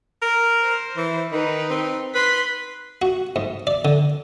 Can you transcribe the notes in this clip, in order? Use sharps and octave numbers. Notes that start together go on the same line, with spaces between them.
A#4
C5
E3
D#3 D#4 B4
C4
B4 C6 B6
F#4
G#2
D5
D3